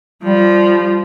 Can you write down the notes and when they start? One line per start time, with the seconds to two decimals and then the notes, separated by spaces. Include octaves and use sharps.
0.23 F3 G3